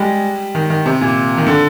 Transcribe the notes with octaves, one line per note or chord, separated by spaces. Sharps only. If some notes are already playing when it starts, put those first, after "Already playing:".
Already playing: G3 G#3
D#3
D#3
C3
A#2
D#3
D3